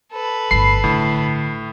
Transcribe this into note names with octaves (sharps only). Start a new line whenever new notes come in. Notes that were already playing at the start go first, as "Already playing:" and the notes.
A4 B4
G1 A2 B5 C7
A2 D3